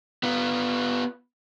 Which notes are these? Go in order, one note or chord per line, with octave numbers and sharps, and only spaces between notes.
B3 F4